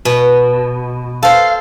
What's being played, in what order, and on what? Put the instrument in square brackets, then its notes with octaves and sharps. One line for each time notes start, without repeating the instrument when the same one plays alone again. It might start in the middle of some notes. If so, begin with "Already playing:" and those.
[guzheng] B2
[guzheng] A4 C5 [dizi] F5